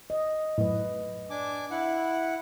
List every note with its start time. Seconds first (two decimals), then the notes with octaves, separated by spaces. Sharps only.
0.10 D#5
0.58 F#2 A2 B4 D#5
1.30 D4 G#5 D6
1.71 E4 F#5